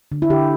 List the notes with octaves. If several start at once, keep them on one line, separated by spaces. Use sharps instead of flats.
D3
E4
D3 G4